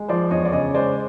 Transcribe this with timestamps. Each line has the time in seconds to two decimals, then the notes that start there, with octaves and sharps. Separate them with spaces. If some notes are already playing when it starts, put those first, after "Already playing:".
Already playing: G#3
0.08 F3 C5 D5
0.31 E2 C#5 D#5
0.45 D5
0.52 C#3 C#5 D#5
0.75 G#3 C5 D5